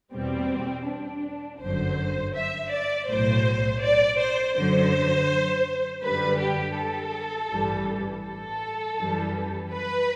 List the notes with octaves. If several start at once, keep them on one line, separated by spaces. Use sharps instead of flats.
E2 B2 G3 C4
D4
G1 F#2 D3 F#3 C5
E5
D5
B1 A2 F#3 C5
D5
C5
F#2 D3 F#3 C5
F#2 D3 G3 B4
G4
A4
A1 G2 E3 G3
A4
F#2 E3 G3
B4